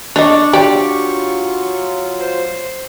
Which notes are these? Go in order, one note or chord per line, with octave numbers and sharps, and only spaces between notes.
D4 C#5 D#5 C#6
F#3 F4 G4 D5 G5
C5